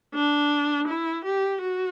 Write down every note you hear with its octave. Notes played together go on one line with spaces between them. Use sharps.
D4
E4
G4
F#4